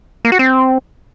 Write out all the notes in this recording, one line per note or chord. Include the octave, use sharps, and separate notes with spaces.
A#3
F#4
C4